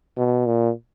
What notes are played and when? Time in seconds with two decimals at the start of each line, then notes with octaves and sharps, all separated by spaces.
0.17 B2
0.46 A#2